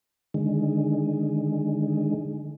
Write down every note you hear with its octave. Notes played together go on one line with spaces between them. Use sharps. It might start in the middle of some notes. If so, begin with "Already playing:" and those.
D3 D#3 G#3